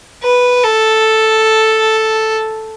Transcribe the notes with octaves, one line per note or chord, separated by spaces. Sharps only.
B4
A4